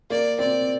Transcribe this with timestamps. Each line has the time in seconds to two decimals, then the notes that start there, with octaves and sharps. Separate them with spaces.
0.10 A#3 D5
0.39 C4 D5